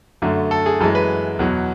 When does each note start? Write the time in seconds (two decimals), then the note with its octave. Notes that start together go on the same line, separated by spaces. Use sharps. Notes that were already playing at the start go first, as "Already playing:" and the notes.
0.22 F#2 D3 A3
0.51 A4
0.66 G#4
0.80 F#2 E3 G#3 A4
0.95 B4
1.39 E2 B2 F#3